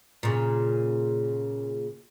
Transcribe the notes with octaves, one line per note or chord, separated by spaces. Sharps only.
A#2 C#3